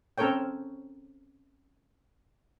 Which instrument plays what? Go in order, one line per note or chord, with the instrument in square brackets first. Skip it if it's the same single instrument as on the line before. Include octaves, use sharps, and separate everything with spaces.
[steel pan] C4 C#4 A4 A#4 C#5 G5